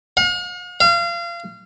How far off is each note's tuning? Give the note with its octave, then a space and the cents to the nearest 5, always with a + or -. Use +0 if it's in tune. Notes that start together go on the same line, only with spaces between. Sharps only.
F5 +45
F5 -30